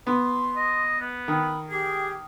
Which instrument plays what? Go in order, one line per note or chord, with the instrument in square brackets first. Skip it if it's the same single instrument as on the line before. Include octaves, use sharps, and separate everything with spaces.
[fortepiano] B3 [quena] C6
[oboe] D#5
B3
[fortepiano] D#3 [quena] B5
[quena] G4 [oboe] G#4